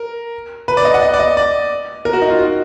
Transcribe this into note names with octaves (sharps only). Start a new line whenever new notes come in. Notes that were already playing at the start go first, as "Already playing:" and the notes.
Already playing: A#4
B4
D5
D#5
F#5
D#5
D5
D#5
D5
A#4
F#4
D#4
F4
F#4